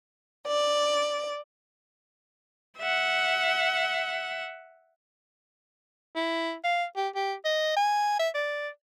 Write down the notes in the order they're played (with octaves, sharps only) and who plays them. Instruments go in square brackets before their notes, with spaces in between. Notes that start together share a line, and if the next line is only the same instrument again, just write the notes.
[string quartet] D5
[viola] E5 F#5
[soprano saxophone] E4
F5
G4
G4
D#5
G#5
E5
D5